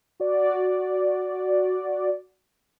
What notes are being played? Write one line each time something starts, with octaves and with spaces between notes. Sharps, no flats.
F#4 D5